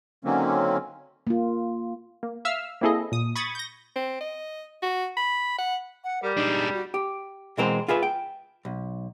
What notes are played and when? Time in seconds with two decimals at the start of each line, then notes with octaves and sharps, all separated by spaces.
0.25 D3 D#3 F#3 A#3 C4 C#4
1.27 A#3 F4
2.23 A#3
2.45 E5 F5 E6 F6
2.81 A#3 C4 E4 G#4 A4 D#5
3.12 A#2 D#6
3.36 B5 C#6 D#6 G#6 A6
3.55 G6 A#6
3.95 C4
4.21 D#5
4.82 F#4
5.17 B5
5.58 F#5
6.04 F#5
6.23 G3 A#4
6.37 G#3 D4 D#4
6.73 F#4
6.94 G4
7.57 B2 E3 G#3 C4 A#4 C5
7.88 F4 G#4 B4 E5
8.03 G5
8.65 B1